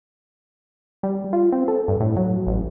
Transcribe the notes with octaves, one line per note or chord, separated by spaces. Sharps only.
G3
F4
C4
A4
G2
A2
F#3
A1